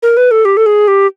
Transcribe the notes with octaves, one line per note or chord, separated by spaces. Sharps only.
A#4
B4
A4
G4
A4
G#4
G4